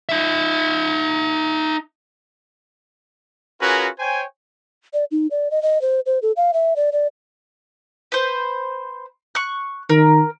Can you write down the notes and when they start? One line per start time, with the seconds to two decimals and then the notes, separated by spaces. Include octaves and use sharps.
0.09 D#4 E5
3.61 C#4 F4 F#4 G#4 A#4 B4
3.98 C5 C#5 G5 G#5
4.94 D5
5.11 D#4
5.31 D5
5.51 D#5
5.62 D#5
5.82 C5
6.06 C5
6.22 A4
6.37 F5
6.53 E5
6.76 D5
6.92 D5
8.12 B4 C5
9.35 C#6 F#6
9.90 D#3 A#4